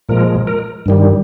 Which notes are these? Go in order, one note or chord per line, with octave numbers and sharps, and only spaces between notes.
A#2 F3 G#3 A#4
A#4
G2 D#3 G3